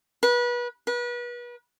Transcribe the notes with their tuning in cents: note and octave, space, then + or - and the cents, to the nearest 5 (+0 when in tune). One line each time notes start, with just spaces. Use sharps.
B4 -30
B4 -35